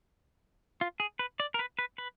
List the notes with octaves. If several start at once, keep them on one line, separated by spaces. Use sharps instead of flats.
F4
G#4
B4
D5
A#4
B4
B4
B4